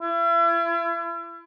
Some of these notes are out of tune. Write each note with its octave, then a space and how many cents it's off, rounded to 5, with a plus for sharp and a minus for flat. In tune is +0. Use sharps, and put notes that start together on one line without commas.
E4 +40